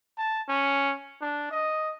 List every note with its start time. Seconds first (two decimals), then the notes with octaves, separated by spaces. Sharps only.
0.18 A5
0.49 C#4
1.22 D4
1.51 D#5